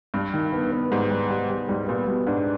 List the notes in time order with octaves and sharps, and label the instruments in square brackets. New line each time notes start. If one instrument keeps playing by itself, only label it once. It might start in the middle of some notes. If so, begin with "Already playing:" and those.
[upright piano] G2 [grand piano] G3
[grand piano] D#3
B3
B3
[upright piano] G#2 [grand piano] G3
[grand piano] G3
G3
G3
[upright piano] G#2 [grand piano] G3
[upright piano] A#2 [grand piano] B3
[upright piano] B2 [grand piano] G3
[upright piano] G#2 [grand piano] D4